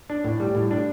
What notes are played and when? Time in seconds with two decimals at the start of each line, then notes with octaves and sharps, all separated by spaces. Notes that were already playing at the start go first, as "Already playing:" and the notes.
0.10 D4
0.24 A2
0.40 G3
0.55 A2
0.71 D4